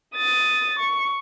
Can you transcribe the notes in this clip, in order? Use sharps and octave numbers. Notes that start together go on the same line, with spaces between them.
D#6 A6
C#6